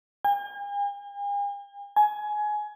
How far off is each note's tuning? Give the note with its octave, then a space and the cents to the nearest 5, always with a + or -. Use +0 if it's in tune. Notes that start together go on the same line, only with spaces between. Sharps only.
G#5 -45
G#5 +20